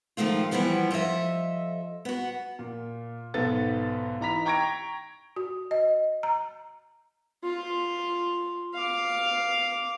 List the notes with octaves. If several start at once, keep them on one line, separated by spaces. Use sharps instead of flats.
D#3 F3 G#3 A3 F4
E3 F3 G3 B3 G4
F3 A4 C5 D#5 E5
B3 F#4
A#2
B1 G#2 B3 A4 A6
E3 D#4 A#5 B5 B6 F7
G5 A#5 C#6 G#6 A#6 D7
F#4
D#5
A#5
F4
F5 D6